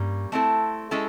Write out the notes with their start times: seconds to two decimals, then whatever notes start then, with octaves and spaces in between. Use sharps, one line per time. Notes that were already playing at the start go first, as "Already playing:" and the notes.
Already playing: G2 G3 A#3 C#4
0.32 A3 C4 E4 A4
0.91 G#3 C#4 E4 A4